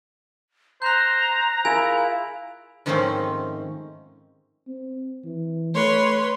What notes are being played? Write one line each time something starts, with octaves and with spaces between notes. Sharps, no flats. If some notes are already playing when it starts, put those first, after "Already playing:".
C5 A#5 F#6 G6
E4 F4 G#4 A#4 G#5
G#2 D#3 F3 A3 C4 C#4
C4
E3
A3 B4 C#5 C6